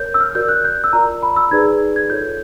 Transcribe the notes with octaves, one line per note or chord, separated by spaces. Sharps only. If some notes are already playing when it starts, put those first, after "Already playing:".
Already playing: A#4 C#5 G6
E6
F6
F#4 A#4 D5 G6
F#6
G6
E6
F4 A#4 D5 A#5
B5
E6
D#4 G#4 B4 D5 G#6
G#6
F4 A4 C#5 G6